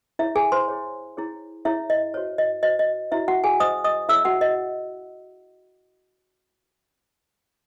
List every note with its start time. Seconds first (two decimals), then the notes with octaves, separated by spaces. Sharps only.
0.19 E4 G#4 C#5 E5
0.36 G#4 G#5
0.52 C5 C6
0.68 E4 G#4 C#5
1.17 E4 G#4 C#5
1.65 E4 G#4 C#5 E5
1.90 D#5
2.14 F#4 C5 C#5
2.38 D#5
2.63 F#4 C5 D#5
2.79 D#5
3.11 E4 F#4 C5 E5
3.28 F#4 F#5
3.44 G#4 G#5
3.60 F#4 C5 D#5 D#6
3.84 D#5 D#6
4.09 E4 G#4 C#5 E5 E6
4.25 F#4 F#5
4.41 D#5